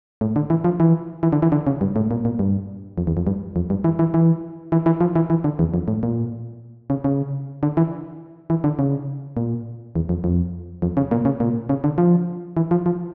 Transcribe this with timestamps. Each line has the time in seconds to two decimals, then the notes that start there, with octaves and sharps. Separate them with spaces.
0.21 A2
0.36 D3
0.50 E3
0.64 F3
0.80 E3
1.23 E3
1.33 D3
1.42 E3
1.52 D3
1.67 C#3
1.81 G2
1.96 A2
2.11 A#2
2.25 A#2
2.39 G2
2.98 F2
3.07 E2
3.17 F2
3.27 G2
3.56 F2
3.70 G2
3.84 E3
3.99 E3
4.14 E3
4.72 E3
4.86 E3
5.01 F3
5.16 E3
5.30 E3
5.44 D3
5.59 E2
5.74 F2
5.88 A2
6.03 A#2
6.90 C#3
7.04 C#3
7.63 D3
7.77 E3
8.50 E3
8.64 D3
8.79 C#3
9.37 A#2
9.96 E2
10.09 F2
10.24 F2
10.82 F2
10.97 C#3
11.11 A#2
11.25 C#3
11.40 A#2
11.69 C#3
11.84 D3
11.98 F3
12.57 E3
12.71 F3
12.86 F3